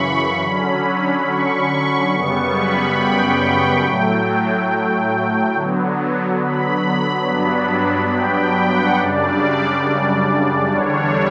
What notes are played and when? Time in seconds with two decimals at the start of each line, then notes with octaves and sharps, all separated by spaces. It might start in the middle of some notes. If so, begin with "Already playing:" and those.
Already playing: F#2 C#3 E3 B5 C#6
0.42 D3 F#3 C#4
1.26 C#6
2.12 F#2 C#3 G3 B3 C#6
2.55 B5
2.98 G5
3.83 A2 F#3 A3
5.55 D3 F#3 B3
6.41 B5
7.27 G2 F#3 B3 D4
8.13 G5
8.41 G5
8.70 F#5
8.98 F#2 C#3 G3 D4 D5
10.70 E2 D3 G3 D4 C#5